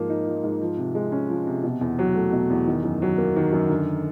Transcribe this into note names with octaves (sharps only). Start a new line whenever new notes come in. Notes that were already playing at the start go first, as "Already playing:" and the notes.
Already playing: G#2 F3 A#3
D#4
F3
G#2
F3
C3
G#3
C#4
F3
C3
B2
E2
F#3
A3
B2
E2
D#3
F#2
F#3
A#3
D#3
F#2
D3